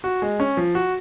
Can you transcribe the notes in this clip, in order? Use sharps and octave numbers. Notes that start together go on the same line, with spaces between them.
F#4
G#3
C#4
F3
F#4